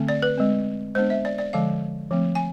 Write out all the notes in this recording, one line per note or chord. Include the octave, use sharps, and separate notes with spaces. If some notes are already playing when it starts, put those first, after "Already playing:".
Already playing: D3 A3 C4
D5
B4
G#3 C4
G#3 B3 D4 C5
E5
D5
D5
D3 F3 G#3 F5
F3 A3 C4
G#5